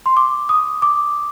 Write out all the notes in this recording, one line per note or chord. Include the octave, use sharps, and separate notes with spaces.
C6
D6
D#6
D6